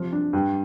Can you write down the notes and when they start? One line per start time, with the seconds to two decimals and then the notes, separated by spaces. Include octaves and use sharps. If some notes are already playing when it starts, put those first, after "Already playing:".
Already playing: C3 F3
0.12 D4
0.33 G2